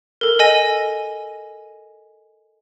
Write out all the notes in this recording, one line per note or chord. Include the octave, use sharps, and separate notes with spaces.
A4 A#4
A4 D#5 G#5 A#6 D#7